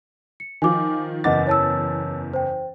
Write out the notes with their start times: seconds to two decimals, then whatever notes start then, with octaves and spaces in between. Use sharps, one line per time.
0.40 C#7
0.62 D#3 F3 G#5 D6
1.24 F#1 E2 D#5 F#5 D6 A6
1.47 C#5 A5 E6
2.34 C5 G5